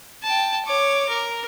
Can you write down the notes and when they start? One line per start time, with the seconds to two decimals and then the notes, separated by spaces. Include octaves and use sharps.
0.23 G5 A5
0.65 C#5 D6
1.09 A#4